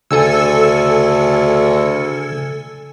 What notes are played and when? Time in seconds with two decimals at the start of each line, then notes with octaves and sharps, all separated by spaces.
0.11 D2 C#3 A4 G#5 E6